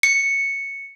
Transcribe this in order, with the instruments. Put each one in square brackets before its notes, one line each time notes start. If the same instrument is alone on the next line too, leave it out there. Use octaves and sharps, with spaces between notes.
[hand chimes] C#7